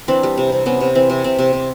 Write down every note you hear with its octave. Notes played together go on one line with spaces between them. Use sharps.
E3 C4 D4
G3
C3
C3
C3 B3 C#4
C3
E3 C4
C3
C3 C4
C3
C3